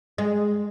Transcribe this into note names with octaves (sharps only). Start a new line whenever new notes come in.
G#3